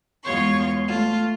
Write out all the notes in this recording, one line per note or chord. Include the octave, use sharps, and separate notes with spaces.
E2 G#3 F4 C#5 C6 C#6
A3 F4